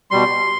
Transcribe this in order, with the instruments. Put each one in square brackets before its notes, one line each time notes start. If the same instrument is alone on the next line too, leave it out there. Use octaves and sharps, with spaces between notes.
[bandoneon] B2 G3 C6